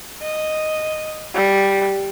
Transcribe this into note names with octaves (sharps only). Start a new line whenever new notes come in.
D#5
G3